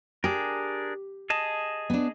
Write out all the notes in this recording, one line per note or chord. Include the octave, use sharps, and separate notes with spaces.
D4 G4 G#4 A#4
G#4 D#5 A5
B3 D4